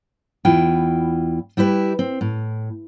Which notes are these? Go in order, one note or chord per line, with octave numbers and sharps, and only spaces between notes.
E2 E4 F4 G5
G3 E4 G4 B4
C4
A2